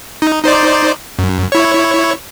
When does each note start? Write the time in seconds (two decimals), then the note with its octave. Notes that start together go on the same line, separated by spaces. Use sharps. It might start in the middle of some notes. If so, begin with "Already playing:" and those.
0.22 D#4
0.43 D#4 C5 D5
1.19 F#2
1.52 E4 C#5